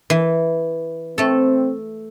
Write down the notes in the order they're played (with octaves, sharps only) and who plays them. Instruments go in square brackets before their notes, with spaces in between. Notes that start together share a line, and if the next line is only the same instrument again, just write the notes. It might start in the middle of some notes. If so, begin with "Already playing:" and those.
[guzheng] E3
[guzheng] A3 A4 [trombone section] C4